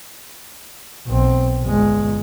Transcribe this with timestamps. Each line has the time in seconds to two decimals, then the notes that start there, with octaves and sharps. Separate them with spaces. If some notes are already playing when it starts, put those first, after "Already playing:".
1.07 B1 C4
1.63 G1 G#3